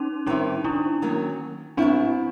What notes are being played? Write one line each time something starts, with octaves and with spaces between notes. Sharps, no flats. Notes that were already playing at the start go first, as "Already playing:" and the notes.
Already playing: C#4 D#4
D#3 G3 C4 C#4 D#4 E4
D4 E4
D#3 F#3 A#3
F#3 B3 C4 D4 E4